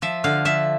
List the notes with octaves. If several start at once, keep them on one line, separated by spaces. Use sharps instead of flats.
F3 E5
D3 F5
F3 E5